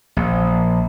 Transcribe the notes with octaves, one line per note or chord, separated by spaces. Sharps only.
A#1